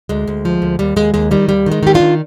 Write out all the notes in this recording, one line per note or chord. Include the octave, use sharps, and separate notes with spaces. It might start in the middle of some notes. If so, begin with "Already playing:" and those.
D2 G#3
D2
F3
D2
D#2 G3
D#2 G#3
D#2 G#3
D#3 G3
D#2 G3
D#3
G#3
D#3 G4
D4 F4
D#3